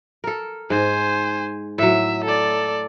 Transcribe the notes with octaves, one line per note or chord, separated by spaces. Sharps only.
A4 A#4
G#2 C5 G#5
A2 F#3 E5
A4 D5